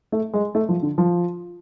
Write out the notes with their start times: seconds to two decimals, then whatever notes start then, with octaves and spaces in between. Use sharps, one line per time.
0.12 A3
0.33 G#3
0.55 A3
0.69 F3
0.83 D3
0.98 F3